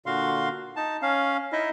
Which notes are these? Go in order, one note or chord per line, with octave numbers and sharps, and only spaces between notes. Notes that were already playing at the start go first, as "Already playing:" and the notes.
A#2 D3 F#4 F5 C6
D#4 A5
C#4 F5
D#4 E4 D#5 E5